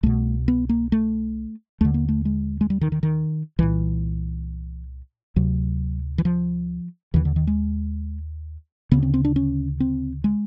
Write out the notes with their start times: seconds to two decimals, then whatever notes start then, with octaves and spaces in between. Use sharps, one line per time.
0.03 C2 B2 A3
0.48 B3
0.69 A#3
0.92 A3
1.81 D#2 D3 A3
1.94 A#3
2.09 A3
2.25 G#3
2.61 G#3
2.70 G3
2.81 D#3
2.92 D#3
3.03 D#3
3.59 C2 A#2 E3
5.36 D2 C3 F#3
6.18 E3
6.25 F3
7.14 D#2 D3 E3
7.25 D3
7.36 D#3
7.47 G#3
8.91 D2 C#3 B3
9.02 C4
9.14 C4
9.25 D4
9.36 C#4
9.80 C4
10.24 G#3